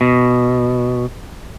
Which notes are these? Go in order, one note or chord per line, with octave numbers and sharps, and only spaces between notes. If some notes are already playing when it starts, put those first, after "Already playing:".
B2